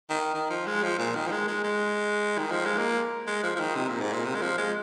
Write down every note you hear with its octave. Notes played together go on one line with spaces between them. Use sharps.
D#3
D#3
F3
G#3
F3
A#2
D#3
F3
G#3
G#3
G#3
D#3
F3
G#3
A#3
G#3
F3
F3
D#3
C3
A#2
G#2
A#2
C3
G#3
F3
G#3